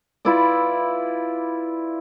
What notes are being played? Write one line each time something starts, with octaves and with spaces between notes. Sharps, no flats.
E4 F4 B4 D5